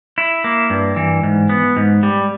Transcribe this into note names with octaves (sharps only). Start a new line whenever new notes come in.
E4
A#3
G2
E3
G#2
B3
G#2
G3